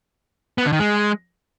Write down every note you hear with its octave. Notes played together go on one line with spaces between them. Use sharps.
B3
D3
D#3
G#3